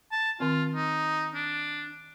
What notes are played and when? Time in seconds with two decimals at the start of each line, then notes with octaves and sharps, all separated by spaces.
0.12 A5
0.40 D#3 C4 F4
0.75 D#4
1.35 D4